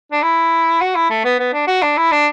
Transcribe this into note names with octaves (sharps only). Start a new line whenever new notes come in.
D4
E4
F#4
E4
A3
B3
B3
D4
F#4
D4
E4
D4